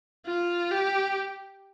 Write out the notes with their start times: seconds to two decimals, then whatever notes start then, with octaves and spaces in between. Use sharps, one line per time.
0.26 F4
0.71 G4